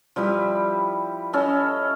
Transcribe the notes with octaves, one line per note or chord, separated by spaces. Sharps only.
F3 G3 E4 B4
C#4 E4 A4 D#5